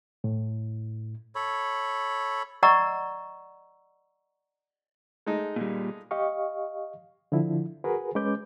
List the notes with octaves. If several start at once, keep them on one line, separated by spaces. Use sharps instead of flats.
A2
A4 C#5 B5
D5 D#5 F#5 A#5 C#6 E6
G#3 A3 D#4
A#2 G3
G4 D#5 F5 C#6
D3 F3 E4
F#4 G#4 A#4 B4
G#3 C#4 B4 D6 G6